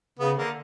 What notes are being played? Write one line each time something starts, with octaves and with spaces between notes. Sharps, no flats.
C#3 B3
D3 A#3